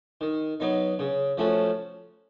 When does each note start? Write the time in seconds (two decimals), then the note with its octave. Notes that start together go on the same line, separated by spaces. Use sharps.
0.21 D#3
0.60 F#3 B3 D#4
0.99 C#3
1.37 F3 A3 C#4 F#4